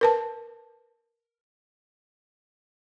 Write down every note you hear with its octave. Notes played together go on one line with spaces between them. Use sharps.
A#4 B4 A5